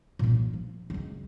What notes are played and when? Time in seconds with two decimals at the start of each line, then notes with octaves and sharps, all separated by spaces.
0.19 A#2 C#4
0.34 E3
0.53 F3
0.90 C#2 F#3